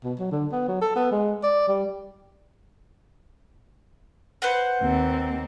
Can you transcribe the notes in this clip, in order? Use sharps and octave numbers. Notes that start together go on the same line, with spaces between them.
B2
F#3
D3
B3
F#3
A4
B3
G#3
D5
G3
B4 C5 F#5
D#2 C4